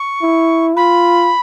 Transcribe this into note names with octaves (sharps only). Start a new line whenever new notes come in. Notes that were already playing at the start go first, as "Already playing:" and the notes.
Already playing: C#6
E4
F4 B5